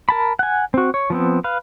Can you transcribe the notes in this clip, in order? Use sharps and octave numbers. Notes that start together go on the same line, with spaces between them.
A#4 A5 B5
F#5 G#5
C4 F#4
C#5
F3 B3 C4
B4 F5